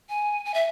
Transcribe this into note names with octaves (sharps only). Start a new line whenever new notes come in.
G#5
G#5
E5